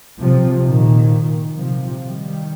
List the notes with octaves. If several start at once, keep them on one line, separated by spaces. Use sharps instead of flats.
C3 F3
A#2 D#3
C3 F3
D#3 G3